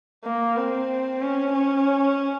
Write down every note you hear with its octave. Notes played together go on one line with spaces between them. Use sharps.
A#3
C4
C#4
C#4